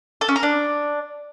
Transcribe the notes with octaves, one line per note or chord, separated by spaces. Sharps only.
A4
C#4
A#4
D4